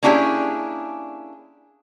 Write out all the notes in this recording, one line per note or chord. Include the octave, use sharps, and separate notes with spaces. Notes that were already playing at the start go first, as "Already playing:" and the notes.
A#3 C#4 D4 E4 G4 G#4